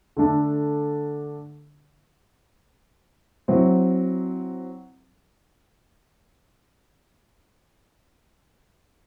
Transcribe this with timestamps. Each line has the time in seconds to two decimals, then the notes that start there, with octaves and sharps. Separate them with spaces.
0.17 D3 A3 D4
3.48 F#3 C4 E4